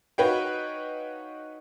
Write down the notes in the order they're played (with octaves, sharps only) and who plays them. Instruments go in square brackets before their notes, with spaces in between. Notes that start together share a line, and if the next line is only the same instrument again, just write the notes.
[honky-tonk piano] D#4 F#4 B4 C#5 F5 G5